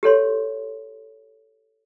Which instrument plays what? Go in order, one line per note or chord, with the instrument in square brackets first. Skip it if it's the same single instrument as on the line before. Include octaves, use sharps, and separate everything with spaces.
[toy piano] G4 A4 C#5 C6